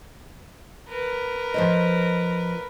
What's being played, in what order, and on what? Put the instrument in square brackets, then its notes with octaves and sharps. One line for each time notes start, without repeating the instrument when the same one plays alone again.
[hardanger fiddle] A#4 B4
[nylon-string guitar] F3 C5 D#5